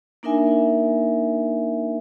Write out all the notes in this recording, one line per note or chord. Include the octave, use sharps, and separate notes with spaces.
A#3 D4 D#4 A#4 E5 G#5